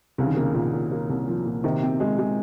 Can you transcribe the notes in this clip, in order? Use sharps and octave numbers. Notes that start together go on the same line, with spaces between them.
C2 C#3
D#3
C#3 A#3
A#2
A#2
A#3
C2
F3
A#2
C3 D#3
C4
G#3
G#3